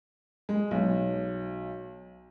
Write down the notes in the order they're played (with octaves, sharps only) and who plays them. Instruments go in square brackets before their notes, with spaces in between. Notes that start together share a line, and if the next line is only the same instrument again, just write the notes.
[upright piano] G#3
B1